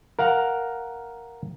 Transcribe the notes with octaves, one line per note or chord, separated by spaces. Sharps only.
A#4 F5 F#5 A#5